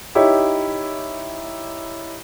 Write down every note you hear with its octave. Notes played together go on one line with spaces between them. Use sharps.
D#4 E4 G4 C#5